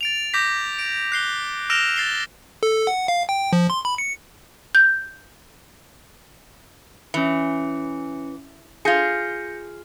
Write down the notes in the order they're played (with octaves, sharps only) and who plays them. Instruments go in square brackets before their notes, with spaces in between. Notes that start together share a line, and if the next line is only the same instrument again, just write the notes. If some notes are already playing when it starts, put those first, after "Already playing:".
[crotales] A6 D7 F7
D6 G6 A#6 B6
D7
F#6 C7 G7
E6 F6 A#6 D7 E7 F7
A6 C7 G7
[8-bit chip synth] A4
F#5
F5
G5
F3
C6
B5
C#7
[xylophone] G6
[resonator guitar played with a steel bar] E3 [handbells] C#4 C#7
[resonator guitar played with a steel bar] F4 G#4 [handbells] G6 A#6 C#7